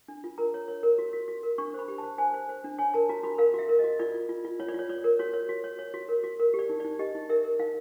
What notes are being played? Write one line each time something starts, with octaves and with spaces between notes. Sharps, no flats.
D4
F4
A#4 A#5
C#5
C#5
A#4
F#4
F#4
F#4
A#4
D4 C#6
C5 B5
G4
A5
C5
C5 G#5
C5
C5
D4
C#5 G#5
A#4 A5
F#4 A#5
F#4 B5
A#4 F5
F#4 E5
A#4
F#4 D#5
F4 D5
F4
F4
F4
F4 C#5
D5
F4 C#5
C#5 D5
A#4
F#4 C#5
C#5
F#4
C#5
C#5
F#4
A#4
F#4
A#4
G4
D5
D#4
D#4 D5
G4 D#5
D#4
A#4 E5
A#4
D#4 F5